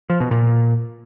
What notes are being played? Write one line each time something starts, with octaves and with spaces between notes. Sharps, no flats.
F3
B2
A#2